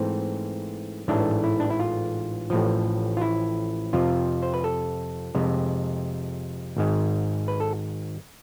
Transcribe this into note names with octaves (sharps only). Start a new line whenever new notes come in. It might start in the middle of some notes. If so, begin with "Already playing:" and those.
Already playing: G#2 E3 A3 C4
A1 G#2 E3 A3 D4
E4
D4
E4
F4
A1 A2 F3
F4
E4
F2 C3 F3 F4
C5
B4
A4
F2 C3 G#3
G#1 G#2 G#3
B4
A4